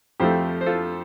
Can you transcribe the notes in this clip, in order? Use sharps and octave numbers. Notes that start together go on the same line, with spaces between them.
F2 F3 A3 G4 C5
C5
F4 A4